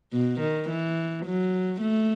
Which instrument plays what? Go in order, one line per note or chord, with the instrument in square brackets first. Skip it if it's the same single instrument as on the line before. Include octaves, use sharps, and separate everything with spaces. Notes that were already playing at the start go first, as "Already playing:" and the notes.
[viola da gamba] B2
D#3
E3
F#3
A3